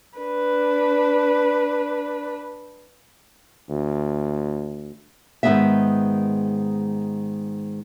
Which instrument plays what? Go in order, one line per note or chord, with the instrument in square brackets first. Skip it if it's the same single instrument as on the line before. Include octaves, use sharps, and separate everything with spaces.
[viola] D4 B4
[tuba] D2
[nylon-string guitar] G#2 D#3 F#3 G#3 B3 E5